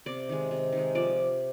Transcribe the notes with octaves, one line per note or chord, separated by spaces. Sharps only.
C3 D5
D#3 G#3
C3
D#3
G#3
F3 D5